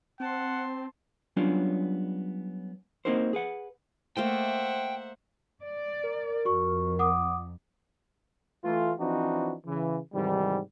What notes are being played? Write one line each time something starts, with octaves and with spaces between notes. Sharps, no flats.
C4 F#5 A5 C6
F#3 G3 B3 C#4 D4 F4
A#3 C4 D#4 F#4 A#4 C5
G#4 B4 F#5
A3 A#3 C5 D#5 E5 F#5 G5
D5
A#4
F2 F#4 C#6
F#5 D6 D#6
E3 A3 F4
E3 F3 C4 D4 D#4 F#4
C#3 E3
G#2 C3 D#3 E3 G3